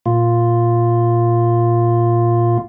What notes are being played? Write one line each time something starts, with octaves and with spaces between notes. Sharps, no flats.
A#2 F4